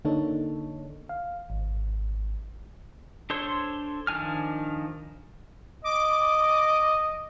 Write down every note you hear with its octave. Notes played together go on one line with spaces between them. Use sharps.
D3 A#3 D4 D#4 A4 C#5
F5
G#1
D4 A4 C5 C#5 C6
D#3 F3 D4 G#5 F6
D#5 D6